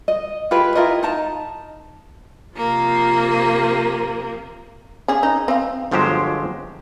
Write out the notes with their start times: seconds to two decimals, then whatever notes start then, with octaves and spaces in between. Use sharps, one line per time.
0.08 D#5
0.51 F4 G4 G#4 B4
0.75 E4 F4 A#4 D#5
1.03 D#4 A5 A#5
2.57 C3 F3 A#3
5.08 C#3 C#4 G#4
5.23 D#4
5.48 C4 C5 F5
5.91 G1 F3 F#3 G#3 G4 C5